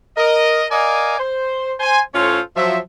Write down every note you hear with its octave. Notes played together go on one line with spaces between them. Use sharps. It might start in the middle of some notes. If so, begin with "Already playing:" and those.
A#4 D#5
A#4 D5 D#5 F5 G#5
C5
C5 G#5
A2 C#4 F4 A4 C5 C#5
F3 F#3 E5